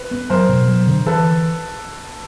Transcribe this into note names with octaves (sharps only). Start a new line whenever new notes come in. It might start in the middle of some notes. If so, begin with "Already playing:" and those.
Already playing: B4
B3
F#3 A#4 C5
B2
F#3
D3
E3 A4 B4